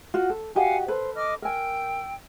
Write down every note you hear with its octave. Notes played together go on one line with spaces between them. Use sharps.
F4 F#4
A4
F#4 G4 D#5 F5 F#5 G#5
A4 B4 C5
D#5 D6 F6
A#4 G5 G#5 E6